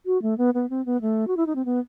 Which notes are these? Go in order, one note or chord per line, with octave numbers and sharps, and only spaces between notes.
F#4
A3
B3
B3
C4
B3
A3
F#4
E4
D#4
C4
B3